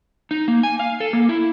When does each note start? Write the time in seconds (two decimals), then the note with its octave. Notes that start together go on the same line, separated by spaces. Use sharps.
0.31 D#4
0.48 A#3
0.63 G#5
0.79 F5
1.00 A4
1.13 A#3
1.29 E4